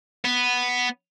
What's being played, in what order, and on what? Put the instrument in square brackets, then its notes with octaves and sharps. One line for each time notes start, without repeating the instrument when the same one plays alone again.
[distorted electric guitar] B3